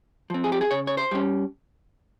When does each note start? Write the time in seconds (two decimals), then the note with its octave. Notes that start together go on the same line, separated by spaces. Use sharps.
0.30 F3 C4
0.44 G#4
0.52 G4
0.61 G#4
0.71 C#3 C#5
0.87 C#5
0.97 C5
1.11 G3 C#4